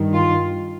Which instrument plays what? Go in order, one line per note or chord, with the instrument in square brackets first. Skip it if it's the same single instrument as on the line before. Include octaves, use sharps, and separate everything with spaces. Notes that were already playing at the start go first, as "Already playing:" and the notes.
Already playing: [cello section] G2 D#3
F4